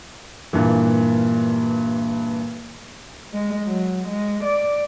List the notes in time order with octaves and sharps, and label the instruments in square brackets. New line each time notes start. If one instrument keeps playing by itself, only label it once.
[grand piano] G2 A#2 E3
[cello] G#3
F#3
G#3
D5